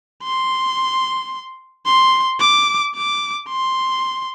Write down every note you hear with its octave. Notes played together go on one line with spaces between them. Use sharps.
C6
C6
D6
D6
C6